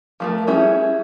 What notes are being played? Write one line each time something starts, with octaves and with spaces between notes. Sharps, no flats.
F3 A3 A#4
G3 C#4 E4 F#4 G#4